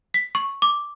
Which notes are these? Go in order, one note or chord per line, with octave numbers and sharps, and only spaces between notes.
B6
C#6
D6